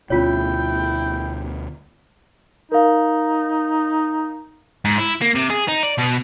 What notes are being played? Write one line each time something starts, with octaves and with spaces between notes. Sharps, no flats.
D2 B2 C#4 E4 F4 C#5 G5
D#4 A#4 F5
G#2
E4
A#3
C3
G#4
D#4
D5
B2